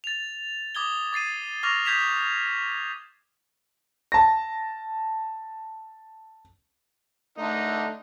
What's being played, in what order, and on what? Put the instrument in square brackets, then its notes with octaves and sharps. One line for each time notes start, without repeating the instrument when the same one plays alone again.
[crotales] A6 F7
D6 D#6 G#6 G7
D6 A6 C7 D#7
C#6 D6 F6 A#6 F7
D#6 G6 G#6 B6 E7 F7
[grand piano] A5 A#6
[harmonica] D3 D#4 [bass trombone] A3